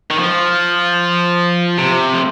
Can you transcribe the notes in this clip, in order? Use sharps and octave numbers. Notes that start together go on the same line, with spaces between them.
D#3
F3
C3
F3